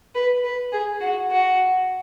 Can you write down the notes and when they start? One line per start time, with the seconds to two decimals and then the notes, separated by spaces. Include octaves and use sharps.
0.15 B4
0.44 B4
0.72 G#4
1.01 F#4
1.30 F#4